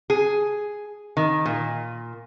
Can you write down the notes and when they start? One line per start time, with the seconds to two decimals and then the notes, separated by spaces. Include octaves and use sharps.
0.10 G#4
1.17 D#3
1.46 A#2